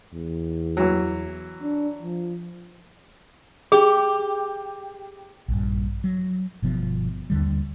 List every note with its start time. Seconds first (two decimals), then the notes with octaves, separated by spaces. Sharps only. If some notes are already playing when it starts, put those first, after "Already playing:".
0.13 E2
0.77 E3 F#3
1.63 D4
2.02 F3
3.72 G4 G#4
5.48 A#1 G2
6.04 F#3
6.62 G1 B2 F3 B3
7.30 D#2 D3 G3